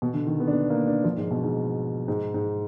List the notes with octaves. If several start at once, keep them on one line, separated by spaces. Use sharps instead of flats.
B2
D3
D#3
B3
D4
B3
A#3
D4
F3
G#2
B2
G#2
G#2
G#2